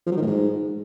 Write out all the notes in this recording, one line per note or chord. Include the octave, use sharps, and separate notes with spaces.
F3
F#3
D#3
A2
G#2